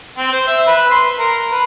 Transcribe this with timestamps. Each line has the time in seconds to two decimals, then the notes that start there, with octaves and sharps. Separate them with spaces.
0.18 C4
0.32 C5
0.47 E5
0.67 B4
0.91 C6
1.18 A#4
1.52 B4